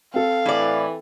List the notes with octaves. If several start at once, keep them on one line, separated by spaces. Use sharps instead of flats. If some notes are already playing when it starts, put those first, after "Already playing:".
C4 A4 F5
A2 E3 D5